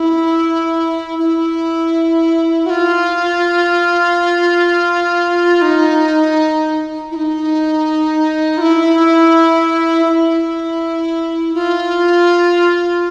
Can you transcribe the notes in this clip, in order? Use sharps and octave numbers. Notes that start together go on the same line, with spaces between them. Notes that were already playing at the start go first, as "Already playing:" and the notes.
Already playing: E4
E4
F#4
F4
D#4
E4
D#4
F4
E4
E4
F4